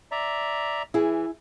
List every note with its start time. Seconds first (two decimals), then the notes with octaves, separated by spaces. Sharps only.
0.12 D5 E5 A#5
0.94 E3 E4 G#4